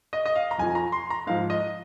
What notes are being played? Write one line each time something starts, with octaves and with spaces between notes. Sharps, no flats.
D#5
D#5
F5
A#5
F2 F3 G#5
A#5
C6
A#5
G#2 F3 F5
D#5